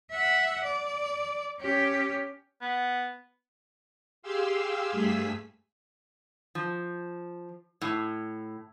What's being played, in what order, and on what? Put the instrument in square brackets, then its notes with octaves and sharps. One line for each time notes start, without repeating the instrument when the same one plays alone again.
[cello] E5 F#5
D5
C#4 G4
[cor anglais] B3
[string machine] G4 G#4 F5 C6 E6
G2 A3 G#4 E6 B6
[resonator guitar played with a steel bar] F3
A2